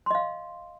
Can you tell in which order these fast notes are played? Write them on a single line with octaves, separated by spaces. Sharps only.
C6 D#5 F5